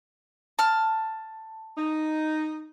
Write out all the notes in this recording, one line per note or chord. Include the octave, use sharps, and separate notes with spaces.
A5 F6
D#4